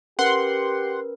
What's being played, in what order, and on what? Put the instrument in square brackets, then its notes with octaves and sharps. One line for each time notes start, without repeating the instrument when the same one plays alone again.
[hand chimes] C#4 A#4 B4 [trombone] G4 [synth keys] F#5 C6